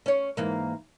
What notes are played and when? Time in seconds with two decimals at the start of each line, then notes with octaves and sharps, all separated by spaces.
0.06 C#4 C#5
0.37 G#2 E3 A#3